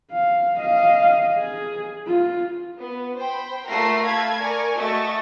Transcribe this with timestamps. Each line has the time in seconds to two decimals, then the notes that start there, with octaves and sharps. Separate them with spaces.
0.12 F5
0.57 D#5 F5
1.38 G#4
2.06 F4
2.79 B3
3.18 C5 G5 B5
3.67 A3 F4 A#4 F#5 A#6 C7
4.04 A3 A4 F5 A5 B5 G#6
4.41 A#4 D5 G#5 C#6
4.75 A3 F#4 D#5 C#6 A6